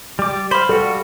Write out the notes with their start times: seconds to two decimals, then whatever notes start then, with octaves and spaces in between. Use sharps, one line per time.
0.19 G3 D6
0.51 C5 F5 B5
0.69 G3 F#4 A4